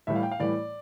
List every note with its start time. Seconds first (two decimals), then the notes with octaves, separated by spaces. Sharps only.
0.07 A2 E3 G3 E5
0.16 F5
0.23 G5
0.31 F5
0.39 A2 E3 G3 D5